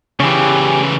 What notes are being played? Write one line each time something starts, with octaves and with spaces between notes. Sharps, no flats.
C#3 E3 C#4 G4